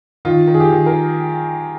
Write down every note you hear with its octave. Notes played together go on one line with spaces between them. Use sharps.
D#3 F4
D#3
G#4
G4
D#3
A#4